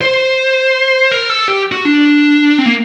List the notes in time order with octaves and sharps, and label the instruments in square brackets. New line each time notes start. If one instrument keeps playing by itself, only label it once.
[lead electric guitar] C5
A#4
A4
G4
F#4
D4
C4
A#3